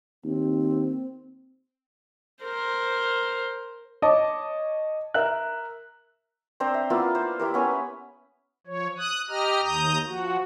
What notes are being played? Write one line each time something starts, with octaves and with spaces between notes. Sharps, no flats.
D#2 C4
A#4 C5
C#5 D#5 A5 D6
A#4 E5 F#6
C4 D4 C5 A#5
E5
A#3 B3 E4 F4
C5
E4 G4 A#4
B3 C#4 B4 G#5
F3 C#5
D#6 F#6
G4 D#5 A#5 F6
D#2 A#5 D#6 G6
F3 F#4